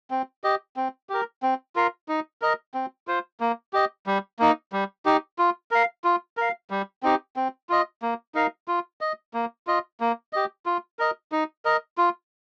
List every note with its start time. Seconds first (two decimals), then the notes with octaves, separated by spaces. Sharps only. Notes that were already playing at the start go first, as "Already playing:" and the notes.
0.11 C4
0.44 G4 D#5
0.77 C4
1.09 G4 A#4
1.43 C4
1.76 F4 A#4 F5
2.08 D#4
2.42 A#4 D#5
2.74 C4
3.07 F4 C5
3.40 A#3
3.73 G4 D#5
4.07 G3
4.39 A#3 D#4
4.72 G3
5.05 D#4 G4
5.38 F4
5.71 A#4 F5
6.04 F4
6.37 A#4 F5
6.70 G3
7.03 C4 D#4 G4
7.36 C4
7.69 F4 D#5
8.02 A#3
8.35 D#4 A#4 F5
8.68 F4
9.01 D#5
9.34 A#3
9.67 F4 D#5
10.00 A#3
10.33 G4 D#5
10.66 F4
10.99 A#4 D#5
11.32 D#4
11.65 A#4 D#5
11.98 F4